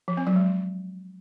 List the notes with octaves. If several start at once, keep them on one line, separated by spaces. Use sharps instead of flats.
F3
C4
F#3
G#3